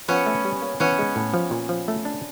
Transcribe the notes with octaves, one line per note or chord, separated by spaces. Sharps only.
F3 B3 C#4
A3
G3
A#3
E3 B3 C#4
G#3
A2
F3
A#2
F3
A3
D4